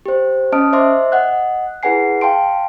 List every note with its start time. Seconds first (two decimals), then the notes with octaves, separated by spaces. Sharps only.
0.06 G4 C5
0.52 C#4 D#5 A5 D#6 F6 D7
0.73 C5 D#5 E5 C6 D6
1.12 D#5 F#5 F#6
1.83 E4 G#4 B4 F#5 G#5 C7
2.21 F5 G5 A5 C6 D7